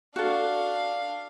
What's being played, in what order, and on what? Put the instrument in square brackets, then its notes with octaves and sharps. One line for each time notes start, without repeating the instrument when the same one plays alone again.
[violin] D4 F5 [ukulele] F#4 A4